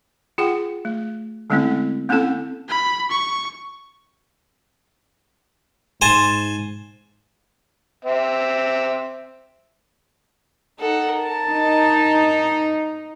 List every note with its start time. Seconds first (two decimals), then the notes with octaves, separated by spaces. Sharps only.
0.38 F4 G#4 F#5 G5
0.85 A3
1.50 D3 G#3 A3 C4 C#4 E4
2.09 A#3 C4 C#4 E4 A4 A5
2.69 B5
3.11 C#6
6.02 G#2 C5 G#5 A5
8.05 C4 E5
10.79 D#4 A4 F#5
11.14 A#4 A5
11.48 D#4